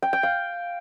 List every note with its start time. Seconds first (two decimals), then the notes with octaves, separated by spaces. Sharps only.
0.02 G5
0.13 G5
0.23 F5